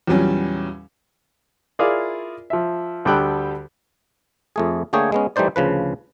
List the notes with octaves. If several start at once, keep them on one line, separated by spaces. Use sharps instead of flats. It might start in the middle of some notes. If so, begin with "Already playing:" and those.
E2 A#2 F#3 G3 C#4
E4 F4 G#4 A#4 D5 F5
F3 E5
D2 G3 A4 G5 B5 F#6
F2 A3 G#4
D3 A3 A#3 G#4 C#5 G5
G#3 B3 C#4
E3 G3 A3 D#4 C5 D5
D2 C#3 F3 B4